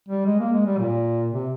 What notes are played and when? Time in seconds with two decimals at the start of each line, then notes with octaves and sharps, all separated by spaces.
0.08 G3
0.26 G#3
0.40 A#3
0.53 G#3
0.66 G3
0.79 A#2
1.33 C3